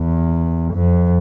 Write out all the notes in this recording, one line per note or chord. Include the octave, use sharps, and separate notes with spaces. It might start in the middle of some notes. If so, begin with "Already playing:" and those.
Already playing: E2
F2